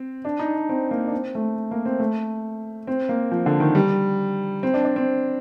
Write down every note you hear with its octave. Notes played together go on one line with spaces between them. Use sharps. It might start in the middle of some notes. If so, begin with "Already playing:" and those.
Already playing: C4
D4
D#4
D4
C4
A#3
D4
C4
A3
A#3
C4
A3
C4
A#3
F3
D3
D#3
G3
C4
D4
D4
C4